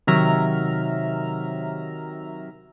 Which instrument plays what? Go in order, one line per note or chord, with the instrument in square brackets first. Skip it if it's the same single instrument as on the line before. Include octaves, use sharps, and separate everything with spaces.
[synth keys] C3 D#3 F#3 E5 A#5 F6